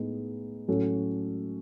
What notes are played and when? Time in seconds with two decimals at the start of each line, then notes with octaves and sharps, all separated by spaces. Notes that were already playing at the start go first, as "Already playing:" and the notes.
Already playing: A2 G#3 B3 D#4 G#4
0.68 A2 F#3 C#4 F#4 A4